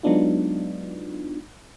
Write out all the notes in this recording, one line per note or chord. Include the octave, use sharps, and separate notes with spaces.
F#3 G#3 B3 D4 D#4 F4